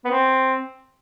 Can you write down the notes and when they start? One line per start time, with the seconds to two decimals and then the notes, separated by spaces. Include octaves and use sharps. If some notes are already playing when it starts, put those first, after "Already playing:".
0.05 B3
0.11 C4